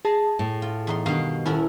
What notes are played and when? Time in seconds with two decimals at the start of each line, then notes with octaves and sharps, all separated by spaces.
0.05 G#4 A5 A#6 C7
0.39 A2
0.62 F4
0.87 E2 D#4 C6
1.06 G2 B2 D#3 F5
1.46 D#1 C#4 E4 F#4 A4 A#4 F6